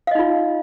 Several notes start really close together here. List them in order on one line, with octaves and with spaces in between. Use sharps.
F5 D#5 D#4 F4